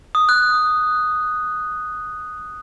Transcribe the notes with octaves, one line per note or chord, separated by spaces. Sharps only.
D#6
F#6